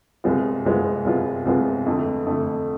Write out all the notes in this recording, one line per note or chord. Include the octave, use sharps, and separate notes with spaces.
C2 C3 G#3 B3 F4
C2 C3 G#3 B3 F4
C2 C3 G#3 B3 F4
C2 C3 G#3 B3 F4
F2 D3 A3
F2 D3 A3